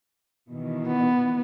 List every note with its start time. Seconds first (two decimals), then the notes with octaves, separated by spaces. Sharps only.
0.50 B2 D#3 E3
0.87 B3